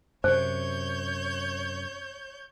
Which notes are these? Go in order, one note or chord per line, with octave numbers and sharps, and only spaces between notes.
F#2 C3 C5 C#5 G6